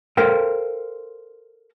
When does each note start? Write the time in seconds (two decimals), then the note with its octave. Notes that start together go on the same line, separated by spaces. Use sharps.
0.17 A4 A#4 C5 F5 G5